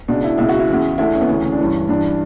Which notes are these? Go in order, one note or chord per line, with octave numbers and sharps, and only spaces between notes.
C#2 B2 D4
E4
C#2 B2 E4
F#4
E4
E2 C#3 E3
D2 D3 E4
C#4
B3
D2 C#3 E3 C#4
C#4
D4
G2 E3 C#4
G2 E3 D4